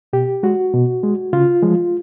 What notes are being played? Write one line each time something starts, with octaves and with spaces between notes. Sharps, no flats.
B2 G4
G#3 F#4
B2
G#3
C#3 F4
F3 G#3